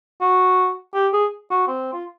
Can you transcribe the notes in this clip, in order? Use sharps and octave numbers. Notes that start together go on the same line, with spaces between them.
F#4
G4
G#4
F#4
C4
F4